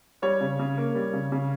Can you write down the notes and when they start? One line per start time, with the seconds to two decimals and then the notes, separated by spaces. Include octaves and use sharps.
0.22 G3 C#5
0.41 C#3
0.59 C#3
0.78 A#3
0.95 G3
1.13 C#3
1.32 C#3